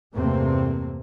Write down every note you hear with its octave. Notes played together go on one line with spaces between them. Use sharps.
E2 G2 C3 A3 A#3 C4